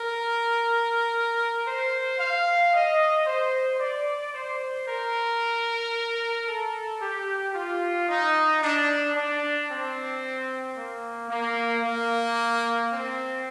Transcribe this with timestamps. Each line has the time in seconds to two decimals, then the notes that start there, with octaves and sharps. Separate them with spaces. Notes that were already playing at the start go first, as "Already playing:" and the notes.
Already playing: A#4
1.65 C5
2.19 F5
2.73 D#5
3.26 C5
3.80 D5
4.34 C5
4.87 A#4
6.48 A4
7.01 G4
7.55 F4
8.09 D#4
8.62 D4
9.15 D4
9.69 C4
10.77 A#3
11.30 A#3
11.83 A#3
12.91 C4